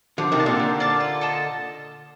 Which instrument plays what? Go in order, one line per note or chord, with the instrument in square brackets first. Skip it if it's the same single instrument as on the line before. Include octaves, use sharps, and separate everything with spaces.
[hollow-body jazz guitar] D3 F3 [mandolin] G4
[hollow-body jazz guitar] C3 D#3
[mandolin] D5 F5 A5
[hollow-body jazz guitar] A#2 D3
[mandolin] G4
D5 F5 A5
F4
A4 D#5 A5